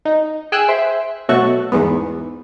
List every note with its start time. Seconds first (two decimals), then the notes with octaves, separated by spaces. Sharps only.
0.05 D#4
0.52 G#4 G5 G#5 E6 F#6
0.69 C5 E5
1.29 B2 F#3 A3 F#4 A4 C#6
1.72 E2 G#2 B3